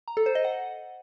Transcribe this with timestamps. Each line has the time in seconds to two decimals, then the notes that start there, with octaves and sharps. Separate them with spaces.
0.08 A#5
0.17 A4
0.26 C5
0.35 D#5
0.45 F#5